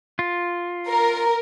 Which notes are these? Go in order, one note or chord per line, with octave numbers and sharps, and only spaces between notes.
F4
A#4